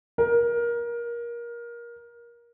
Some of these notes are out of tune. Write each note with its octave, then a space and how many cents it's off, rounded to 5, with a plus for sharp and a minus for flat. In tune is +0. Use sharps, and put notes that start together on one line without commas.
A#4 +20